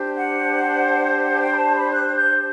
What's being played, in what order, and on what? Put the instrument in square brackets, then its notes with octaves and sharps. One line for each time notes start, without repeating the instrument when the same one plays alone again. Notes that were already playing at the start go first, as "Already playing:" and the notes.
Already playing: [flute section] D4 G4 C5
F#5
F#5
G5
B5
A5
B5
F#6
G6